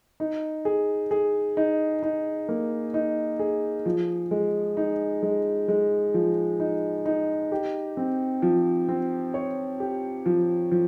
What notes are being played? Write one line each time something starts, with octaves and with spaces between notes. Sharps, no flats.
D#4
G#4
G#4
D#4
D#4
A#3
D#4
G#4
F3
G#3
D#4
G#3
G#3
F3
D#4
D#4
G4
C4
F3
C4
C#5
G4
F3
F3